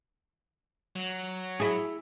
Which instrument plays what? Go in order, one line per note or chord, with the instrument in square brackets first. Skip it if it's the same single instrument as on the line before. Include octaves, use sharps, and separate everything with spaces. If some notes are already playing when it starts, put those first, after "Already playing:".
[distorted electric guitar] F#3
[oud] E4 G#4